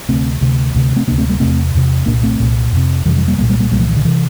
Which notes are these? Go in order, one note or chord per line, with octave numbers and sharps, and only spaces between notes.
D2 C3 A3 C4
D2 C3
D2 C3
A3 C4
D2 C3 A#3 D4
A3 C4
G3 A#3
E2 C3 A3 C4
E2 C3
C2 A#2 A#3 D4
A3 C4
C2 A#2
F2 C3
F2 C3 E3 G3
E3 G3
G3 A#3
C2 A#2 G3 A#3
G3 A#3
G3 A#3
C2 A#2 G3 A#3
F3 A3
E3
D3
C3 E3